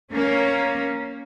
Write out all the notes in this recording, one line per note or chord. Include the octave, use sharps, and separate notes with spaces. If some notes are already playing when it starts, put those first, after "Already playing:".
A#3 C#4